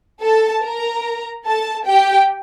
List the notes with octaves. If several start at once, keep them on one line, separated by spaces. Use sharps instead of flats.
A4 A5
A#4 A#5
A4 A5
G4 G5